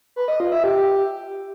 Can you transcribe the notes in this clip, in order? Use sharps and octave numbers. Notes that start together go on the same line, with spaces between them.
B4
D#5
F4
E5
G4